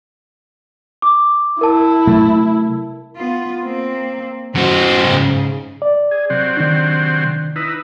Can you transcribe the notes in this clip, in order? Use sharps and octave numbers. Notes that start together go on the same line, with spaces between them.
D6
E4 A#4 A5
C3 F#3 A3
B3 F4
A#3 C4
F#2 F#4 C5
G#2 C#3
D5
G#4
C3 F#3 C4
D#3 D4
D#4 E4 B4